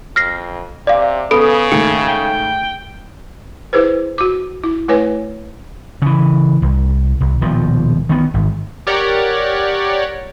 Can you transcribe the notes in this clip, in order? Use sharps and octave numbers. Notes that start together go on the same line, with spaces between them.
F2 F6 A#6 C7
C3 D5 F5 D6
C#3 B3 A4 B5 D#6 D7
G#2 D#3 A3 A#3 C#7
G5
E4 G#4 B4 C5
F#4 D6
E4
A3 E4 B4 C#5 G#5
C#3 E3
C2
C2
D#1 B2 F3
D#3 B3
G#1
G4 A#4 C#5 D5 F#5